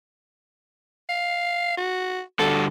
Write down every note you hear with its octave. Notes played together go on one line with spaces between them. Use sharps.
F5
F#4
D3 G3 F#4 A4